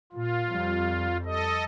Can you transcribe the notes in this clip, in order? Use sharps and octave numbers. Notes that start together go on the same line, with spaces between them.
A#2 F4
F2 G3
A4 D#5